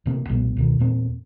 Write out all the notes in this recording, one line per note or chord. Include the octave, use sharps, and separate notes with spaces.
E1 C3 A3 A#3
B1 A#2 G#3 B3
C#2 B2 D#3
E2 A#2 C4